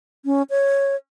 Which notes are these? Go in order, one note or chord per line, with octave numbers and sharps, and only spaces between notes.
C#4
C#5